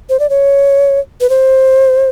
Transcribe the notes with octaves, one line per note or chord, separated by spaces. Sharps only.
C5
D5
C#5
B4
C5